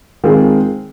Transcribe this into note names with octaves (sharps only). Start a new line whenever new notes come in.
D#3 G#3 C4 F4 G#4